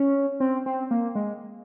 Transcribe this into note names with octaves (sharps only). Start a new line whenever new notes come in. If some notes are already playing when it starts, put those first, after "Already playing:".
Already playing: C#4
C4
C4
A#3
G#3